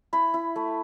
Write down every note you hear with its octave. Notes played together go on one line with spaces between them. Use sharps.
E4 B5
E4
A3